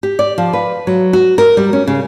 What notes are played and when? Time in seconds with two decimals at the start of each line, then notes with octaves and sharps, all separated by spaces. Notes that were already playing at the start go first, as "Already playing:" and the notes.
0.03 G4
0.19 D5
0.38 F3
0.53 B4
0.87 F#3
1.13 F#4
1.38 A#4
1.57 G3
1.73 C#4
1.88 C#3